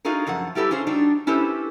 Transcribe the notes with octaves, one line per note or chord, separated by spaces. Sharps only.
D#4 F4 F#4 G#4 A#4
F#2 F3 A3 F#5
G3 E4 G4 A4 B4
C#4 F4 G#4 C5
G3 D4 D#4 F#4
C#4 E4 G4 A4 B4 C5